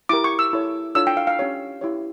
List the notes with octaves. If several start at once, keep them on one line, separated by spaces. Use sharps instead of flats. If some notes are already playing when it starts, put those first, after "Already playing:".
E4 G4 A#4 D6
C#6
E6
E4 A4 C#5
D4 F4 A4 C#5 E6
G5
F5
F5
C#4 G4 C#5
E4 G4 C#5